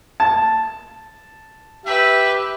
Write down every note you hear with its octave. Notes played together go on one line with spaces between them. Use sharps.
A5
G4 B4 E5